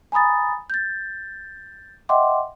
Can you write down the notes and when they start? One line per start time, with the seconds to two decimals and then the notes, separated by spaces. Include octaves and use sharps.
0.12 G#5 A#5 B5 D#6 A6
0.70 G6 A6
2.09 D#5 E5 F#5 G5 C6 D6